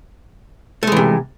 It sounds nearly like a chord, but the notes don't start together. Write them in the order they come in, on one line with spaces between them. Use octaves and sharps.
A3 G#3 E3 C3